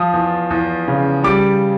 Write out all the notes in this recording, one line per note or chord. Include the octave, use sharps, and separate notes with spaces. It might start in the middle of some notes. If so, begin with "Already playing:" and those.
Already playing: F3 D#6
E2
E2
C#3
G3 D6